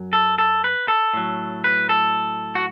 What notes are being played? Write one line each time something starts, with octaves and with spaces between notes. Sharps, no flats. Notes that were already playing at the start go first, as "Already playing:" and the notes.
Already playing: F#2 F#3
A4
A4
B4
A4
A2 F#3
B4
A4
F#4